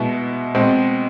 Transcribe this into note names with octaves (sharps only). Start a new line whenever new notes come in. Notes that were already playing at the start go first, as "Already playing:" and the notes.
Already playing: B2 G#3 B3 E4
B2 G#3 C4